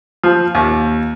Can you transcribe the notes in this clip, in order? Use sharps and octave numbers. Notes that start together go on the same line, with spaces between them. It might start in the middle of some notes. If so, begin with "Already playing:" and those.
F3
D#2